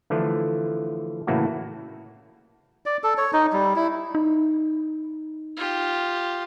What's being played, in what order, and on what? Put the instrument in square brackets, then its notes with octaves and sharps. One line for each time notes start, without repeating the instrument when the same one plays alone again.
[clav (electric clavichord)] D3 E3 F3 A3
A2 C#3 E3 A3 A#3 F#4
[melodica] D5
A4
C#5
D#4
G3
E4
[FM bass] D#4
[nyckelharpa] F4 G4